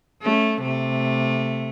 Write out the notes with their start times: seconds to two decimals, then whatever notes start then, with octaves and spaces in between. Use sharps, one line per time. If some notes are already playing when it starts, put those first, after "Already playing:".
0.23 A3 C#4
0.62 C3 A3